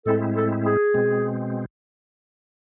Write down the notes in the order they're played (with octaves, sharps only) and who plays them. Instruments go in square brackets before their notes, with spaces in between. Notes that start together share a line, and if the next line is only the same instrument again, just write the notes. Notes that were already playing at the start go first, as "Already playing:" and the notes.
[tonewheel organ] A2 G#3 C4 E4 [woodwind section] A4
[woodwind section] A4
G#4
[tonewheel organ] B2 G#3 C4